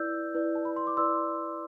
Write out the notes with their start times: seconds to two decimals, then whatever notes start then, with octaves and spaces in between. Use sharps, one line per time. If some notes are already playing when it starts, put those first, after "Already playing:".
Already playing: E4 B4 D5 E6 G6
0.34 E4 B4 D5
0.55 A5
0.65 B5
0.76 C6
0.87 D6
0.97 E4 B4 D5 C6 E6